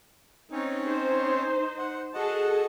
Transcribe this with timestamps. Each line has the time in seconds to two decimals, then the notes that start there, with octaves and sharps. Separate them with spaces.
0.52 C4 C#4 D#4 C#5
0.85 D#4 C5
1.78 F#5
2.14 F#4 G#4 A4 D#5 F#5 A5